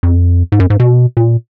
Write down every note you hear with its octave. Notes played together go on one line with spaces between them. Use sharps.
F2
G#2
F#2
G#2
B2
A#2